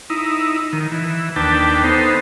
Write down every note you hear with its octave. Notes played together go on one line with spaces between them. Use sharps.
D#4 E4
D#3
E3
D#2 D4 B4 G5 A5
B3 D#4 A4 C5